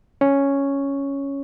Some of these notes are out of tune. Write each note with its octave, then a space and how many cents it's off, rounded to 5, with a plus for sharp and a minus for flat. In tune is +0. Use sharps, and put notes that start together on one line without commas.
C#4 +0 C#5 +0